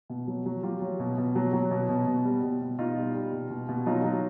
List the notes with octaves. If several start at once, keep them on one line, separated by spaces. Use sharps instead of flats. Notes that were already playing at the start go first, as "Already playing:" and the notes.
B2
F#3
F#3
F#3 F4 G4
F#3
B2
B2
F#3
F#3
B2
B2
B2
G3
B2
B2
B2 D#4 F4
G3
G3
B2
B2
B2
F#3 D#4 F4
F#3